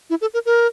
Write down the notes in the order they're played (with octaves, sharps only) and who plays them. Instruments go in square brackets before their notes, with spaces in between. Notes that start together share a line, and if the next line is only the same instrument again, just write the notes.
[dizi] E4
A4
A#4
A#4